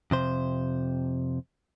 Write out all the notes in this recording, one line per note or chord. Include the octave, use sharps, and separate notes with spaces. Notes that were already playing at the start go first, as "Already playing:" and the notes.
F2 C3 C5